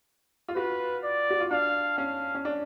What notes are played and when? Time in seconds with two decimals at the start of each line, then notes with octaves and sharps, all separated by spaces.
0.48 F4
0.56 F#4 B4
1.04 D5
1.30 F#4
1.40 F4
1.51 D4 F5
1.98 C#4 F5
2.34 C#4
2.45 D4